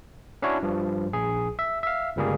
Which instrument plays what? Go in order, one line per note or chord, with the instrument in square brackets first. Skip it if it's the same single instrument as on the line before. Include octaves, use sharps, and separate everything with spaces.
[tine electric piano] C#4 D4 E4 F#4 C#5
G2 F3
A#1 G#4
E5
E5 F5
G1 C#2 G3 A#3 G#4